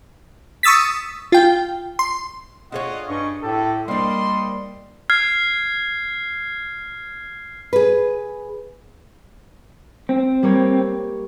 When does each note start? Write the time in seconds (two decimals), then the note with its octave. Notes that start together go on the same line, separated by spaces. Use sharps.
0.63 C#6 D#6 E6 A6 B6
1.32 F4 G5
1.99 C6
2.72 D4 F4 G#4 C#5 D#5 F#5
3.09 G2 C#4 D#5 C#6
3.42 A2 G4 A4
3.88 G3 A#3 D4 C5 D#5 C6
5.10 F6 G#6 C7
7.73 G#4 B4
10.09 C4
10.43 G3 A#3 C#5